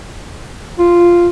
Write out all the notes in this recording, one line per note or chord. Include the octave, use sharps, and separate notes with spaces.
F4